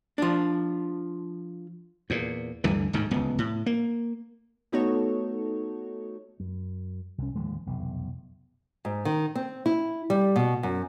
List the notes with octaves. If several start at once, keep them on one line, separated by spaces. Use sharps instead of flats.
F3 D4
E2 A#2
D2 G2 D3 E3
D1 D2 G#2 D#3
D1 C#2 B3
A2
A#3
A3 B3 D#4 F#4 A4 C#5
F#2
C2 C#4
D1 D#2 F3 G#3
F1 B1 E2
G#2
D#3
C4
E4
G3
B2
F#2